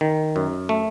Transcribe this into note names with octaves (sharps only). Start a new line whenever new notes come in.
D#3
F#2
A3